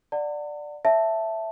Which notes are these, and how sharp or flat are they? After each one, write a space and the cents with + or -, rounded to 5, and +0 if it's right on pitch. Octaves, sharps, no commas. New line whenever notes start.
D5 +10 F#5 -5 A5 +45
C#5 +5 E5 +0 A5 +0